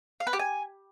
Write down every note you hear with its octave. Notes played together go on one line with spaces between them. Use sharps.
F5
B4
G4
G#5